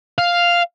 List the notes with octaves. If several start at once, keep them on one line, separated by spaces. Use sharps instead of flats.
F5